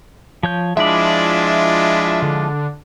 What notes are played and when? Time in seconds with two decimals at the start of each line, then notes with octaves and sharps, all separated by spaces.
0.43 F3 C#5 G6
0.77 F3 G#3 D4 E4 F4 D5 E5
2.22 D3